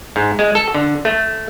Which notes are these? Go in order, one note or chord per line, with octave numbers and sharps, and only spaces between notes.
G#2
G#3
A4
D3
A3